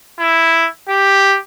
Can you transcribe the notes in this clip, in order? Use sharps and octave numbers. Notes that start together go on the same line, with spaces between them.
E4
G4